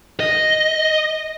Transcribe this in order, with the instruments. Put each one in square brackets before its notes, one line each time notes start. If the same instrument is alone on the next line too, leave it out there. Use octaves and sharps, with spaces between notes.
[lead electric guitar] D#5